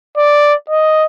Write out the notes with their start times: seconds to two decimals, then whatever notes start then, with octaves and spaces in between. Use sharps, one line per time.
0.17 D5
0.70 D#5